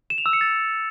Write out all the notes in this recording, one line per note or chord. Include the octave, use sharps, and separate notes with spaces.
E7
F7
E6
C#7
A6